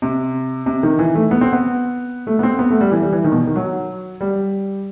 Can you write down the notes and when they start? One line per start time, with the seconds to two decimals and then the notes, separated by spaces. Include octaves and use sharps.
0.02 C3
0.66 C3
0.83 D#3
0.99 E3
1.15 A3
1.31 B3
1.41 C4
1.53 B3
2.27 A3
2.39 B3
2.43 C4
2.59 B3
2.70 A3
2.81 G3
2.92 E3
3.02 G3
3.12 E3
3.24 D#3
3.32 B2
3.47 D#3
3.56 F#3
4.21 G3